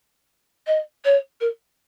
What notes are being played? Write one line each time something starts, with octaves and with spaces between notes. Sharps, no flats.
D#5
C#5
A#4